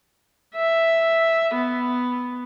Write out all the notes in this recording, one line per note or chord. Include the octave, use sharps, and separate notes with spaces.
E5
B3